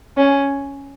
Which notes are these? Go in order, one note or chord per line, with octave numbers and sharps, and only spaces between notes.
C#4